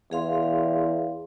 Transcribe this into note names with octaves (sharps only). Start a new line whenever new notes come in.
E2 G#4 F5 C6